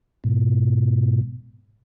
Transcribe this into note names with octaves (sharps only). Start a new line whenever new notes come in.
G#2 B2